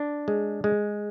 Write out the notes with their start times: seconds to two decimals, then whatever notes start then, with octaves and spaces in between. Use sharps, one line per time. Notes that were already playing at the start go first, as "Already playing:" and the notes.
Already playing: D4
0.28 G#3
0.64 G#3